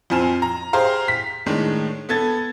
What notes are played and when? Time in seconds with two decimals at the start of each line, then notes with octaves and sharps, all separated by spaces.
0.10 F2 F3 C4 G#5 F6 E7
0.42 A#5
0.73 G4 G#4 C5 F5 A#5
1.08 B6
1.46 A2 D#3 G#3 D4
2.09 B3 A4 G#6 A6